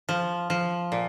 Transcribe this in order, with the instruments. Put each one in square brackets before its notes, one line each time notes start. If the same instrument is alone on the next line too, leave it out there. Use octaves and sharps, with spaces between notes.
[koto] F3
F3
A#2